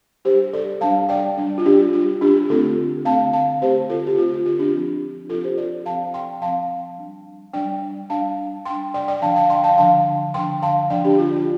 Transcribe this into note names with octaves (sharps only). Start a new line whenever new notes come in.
G3 D4 G4 C5
A4 D5
G3 D4 F5 A5
D5 G5
G3 D4
F4
D4 G4
G3 D4 F4
D4 G4
D3 A3 C4 F4 A4
D3 A3 C4 F5 A5
F5 A5
D3 A3 C4 G4 C5
F4 A4
G4
D3 A3 C4 F4
F4
F4
D4 G4
F3 C4
F3 C4 F4 A4
G4 C5
A4 D5
F3 C4 F5 A5
G5 C6
F3 C4 F5 A5
G3 D4
G3 D4 D5 G5
G3 D4 F5 A5
G3 D4 G5 C6
D5 G5
D5 G5
D3 F3 D4 F5 A5
F5 A5
G5 C6
F5 A5
D3 F3 D4 F5 A5
D3 F3 D4 G5 C6
F5 A5
D3 F3 D4 D5 G5
D4 G4
F4
F4